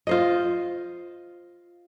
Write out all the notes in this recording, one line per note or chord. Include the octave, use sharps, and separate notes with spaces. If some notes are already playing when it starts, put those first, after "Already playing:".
F4 C5 D#5